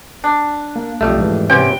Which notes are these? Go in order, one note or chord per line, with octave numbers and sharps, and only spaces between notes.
D4
A#3
B1 F2 G3 A3
G#2 E3
C3 B3 C#4 G5